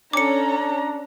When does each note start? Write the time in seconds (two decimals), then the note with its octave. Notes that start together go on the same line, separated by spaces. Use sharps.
0.13 C#4 D4 A4 A#5 D6 C#7